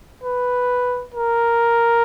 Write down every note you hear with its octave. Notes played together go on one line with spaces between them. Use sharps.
B4
A#4